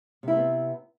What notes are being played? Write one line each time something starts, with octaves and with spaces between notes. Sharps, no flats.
C3 B3 C4 E4